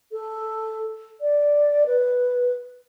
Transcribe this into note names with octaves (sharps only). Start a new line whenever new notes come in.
A4
D5
B4